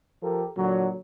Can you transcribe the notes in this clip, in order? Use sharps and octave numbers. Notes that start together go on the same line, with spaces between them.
F3 G4 A4 A#4
A#2 D3 F#3